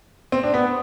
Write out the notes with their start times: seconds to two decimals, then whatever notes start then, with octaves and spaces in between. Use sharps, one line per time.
0.32 C4
0.43 D4
0.54 B3